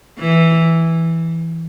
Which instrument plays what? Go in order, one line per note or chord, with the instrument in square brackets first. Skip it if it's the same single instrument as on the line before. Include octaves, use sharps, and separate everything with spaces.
[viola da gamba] E3